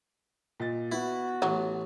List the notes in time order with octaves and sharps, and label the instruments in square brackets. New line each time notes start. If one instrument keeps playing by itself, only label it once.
[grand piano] A#2 D#5 A6
[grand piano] B3 [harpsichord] E4 [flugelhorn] F#4
[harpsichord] A1 [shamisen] F#3